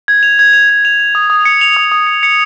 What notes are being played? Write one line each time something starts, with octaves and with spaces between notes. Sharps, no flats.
G#6
F7
G#6
F7
G#6
F7
F7
D#6
D#6
C#7
F7
D#6
D#6
C#7
C#7